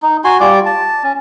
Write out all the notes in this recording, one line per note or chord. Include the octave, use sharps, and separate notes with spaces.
D#4
F#4 G#5 C6
G3 F4 D5 D6
A5
C#4